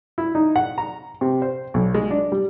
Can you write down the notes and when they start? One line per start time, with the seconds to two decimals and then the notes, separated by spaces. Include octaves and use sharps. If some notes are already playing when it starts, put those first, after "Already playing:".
0.18 E4
0.35 D#4
0.56 F#5
0.78 A#5
1.21 C3
1.42 C5
1.74 B1
1.94 G#3
2.11 D4
2.32 G3